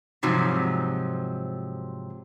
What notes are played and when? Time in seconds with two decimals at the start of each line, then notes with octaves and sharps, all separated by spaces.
0.23 G#2 C3 F3 F#3